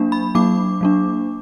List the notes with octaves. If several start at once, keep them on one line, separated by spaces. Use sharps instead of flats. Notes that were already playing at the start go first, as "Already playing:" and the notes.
Already playing: F#3 A#3 D4
B5
F#3 A#3 D4 D6
F#3 A#3 D4